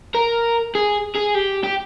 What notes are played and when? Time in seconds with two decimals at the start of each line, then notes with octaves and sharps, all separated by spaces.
0.14 A#4
0.75 G#4
1.15 G#4
1.34 G4
1.64 G4